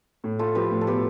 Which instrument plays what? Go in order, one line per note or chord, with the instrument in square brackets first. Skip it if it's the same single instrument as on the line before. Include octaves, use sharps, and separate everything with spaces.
[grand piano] A2
[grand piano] A3 [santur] F4 A4
[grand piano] F3 [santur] G4 B4
[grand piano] A2
[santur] A4
[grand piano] B2 [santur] G4 B4